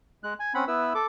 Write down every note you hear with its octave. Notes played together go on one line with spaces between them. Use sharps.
G#3 F#6
G#5
C4 C#4 F#5 B5
B3 E4 B4 E6
A4 D6